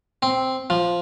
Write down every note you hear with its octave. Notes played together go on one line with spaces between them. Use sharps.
C4
F3